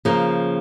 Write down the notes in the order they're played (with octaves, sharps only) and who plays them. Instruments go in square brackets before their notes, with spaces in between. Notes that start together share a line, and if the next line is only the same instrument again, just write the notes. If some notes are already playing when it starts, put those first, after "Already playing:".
[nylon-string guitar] C#3 F3 A#3